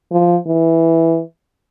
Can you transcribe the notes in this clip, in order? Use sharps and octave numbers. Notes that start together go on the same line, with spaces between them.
F3
E3